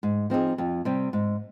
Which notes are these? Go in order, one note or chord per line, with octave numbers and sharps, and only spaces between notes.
G#2
F3 C4 D#4 G#4
F2
C3 G3
G#2